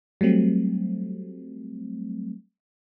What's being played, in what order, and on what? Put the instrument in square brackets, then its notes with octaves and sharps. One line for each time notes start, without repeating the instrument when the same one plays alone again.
[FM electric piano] F#3 G3 A3 C4